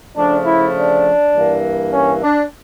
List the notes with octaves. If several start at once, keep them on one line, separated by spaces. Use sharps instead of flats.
C#3 F3 A3 D4
E4
D4
G2 E3 A#3
C#4
D4